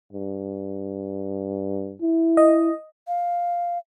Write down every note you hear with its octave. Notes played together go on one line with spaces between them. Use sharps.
G2
E4
D#5
F5